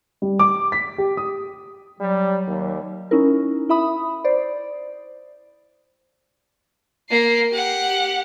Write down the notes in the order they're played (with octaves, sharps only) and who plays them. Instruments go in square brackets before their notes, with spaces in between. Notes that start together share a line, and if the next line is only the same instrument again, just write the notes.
[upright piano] G3
D6
B6
G4
D#6
[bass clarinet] F#3 [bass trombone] G3
[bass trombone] D#2
[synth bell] C#4 D#4 E4 A#4
E4 E5 B5 D#6
C5 D5
[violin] A#3 C7
G4 F#5